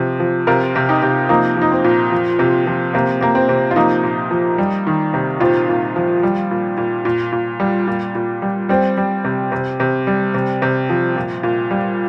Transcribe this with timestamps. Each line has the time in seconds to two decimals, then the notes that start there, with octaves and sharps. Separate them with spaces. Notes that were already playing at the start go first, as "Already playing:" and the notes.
Already playing: C3 F3
0.20 F3
0.47 C3 F4 A#4
0.76 C3
0.89 D#4 G4
1.02 C3
1.29 F3 A#3 D#4
1.57 F3 D#4
1.71 C4
1.84 A#2
2.12 F3
2.39 C3
2.67 F3
2.94 C3 A#3
3.21 C3 A#3
3.35 C4
3.49 C3
3.71 F4
3.76 F3 A#3 D#4
4.03 A#2
4.31 F3
4.58 G3
4.87 D#3
5.14 C3
5.40 A#2 C4 F4
5.69 A#2
5.96 F3
6.23 G3
6.51 A#2
6.77 A#2
7.05 A#2
7.32 A#2
7.60 G3
7.88 A#2
8.15 A#2
8.42 G3
8.69 G3 C4
8.97 G3
9.25 C3
9.52 C3
9.80 C3
10.07 G3
10.34 C3
10.62 C3
10.90 F3
11.16 A#2
11.43 A#2
11.71 G3